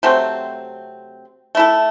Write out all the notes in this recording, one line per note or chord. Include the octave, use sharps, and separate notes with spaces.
C3 F#3 A3 C4
A3 E4 A4